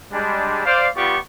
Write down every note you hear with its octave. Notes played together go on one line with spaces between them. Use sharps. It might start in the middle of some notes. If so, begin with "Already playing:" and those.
G3 G#3 D4
C5 D5 F5
G3 B3 F4 G4 D5 C#6